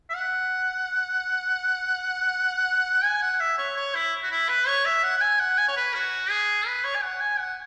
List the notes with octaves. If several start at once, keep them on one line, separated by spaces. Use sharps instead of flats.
E5
F#5
G#5
F#5
E5
C#5
C#5
E4
F#4
E4
B4
C#5
E5
F#5
F#5
G#5
F#5
G#5
C#5
B4
F#4
G#4
B4
C#5
G#5
F#5
G#5
F#5